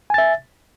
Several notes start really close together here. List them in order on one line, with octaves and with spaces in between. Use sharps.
G#5 A6 E5